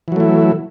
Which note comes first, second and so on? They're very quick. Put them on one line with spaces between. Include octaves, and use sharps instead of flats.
E3 F#3 A3 E4